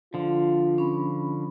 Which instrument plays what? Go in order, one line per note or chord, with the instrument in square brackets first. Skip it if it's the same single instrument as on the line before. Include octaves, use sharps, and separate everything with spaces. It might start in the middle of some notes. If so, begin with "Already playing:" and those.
[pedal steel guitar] D3 F3 [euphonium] F4
[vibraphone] C#4 B5